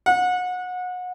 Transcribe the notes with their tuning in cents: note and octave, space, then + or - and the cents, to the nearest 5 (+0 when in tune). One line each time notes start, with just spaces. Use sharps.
F#5 -30